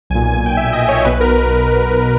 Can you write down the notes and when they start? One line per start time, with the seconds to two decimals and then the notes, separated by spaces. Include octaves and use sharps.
0.10 B1 G#5
0.15 A#2
0.22 G#5
0.33 G#5
0.46 G5
0.57 E5
0.73 D#5
0.89 C#5
1.05 B1 B2 B4
1.21 A#4